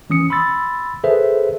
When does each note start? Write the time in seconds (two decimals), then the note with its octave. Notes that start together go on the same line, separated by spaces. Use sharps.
0.10 E3 C#4 D#6 C#7
0.30 B5 C6 E6 A6
1.04 G#4 A4 B4 C5 E5